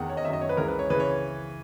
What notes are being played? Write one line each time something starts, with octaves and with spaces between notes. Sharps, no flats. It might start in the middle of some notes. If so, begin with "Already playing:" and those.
Already playing: E2 D#3 F#5
C#5
D#5
F#2 D#3 E5
D#5
C#5
B4
C#2 C#3 E3 A#4
B4
C#5
C#3 E3 B4
C#5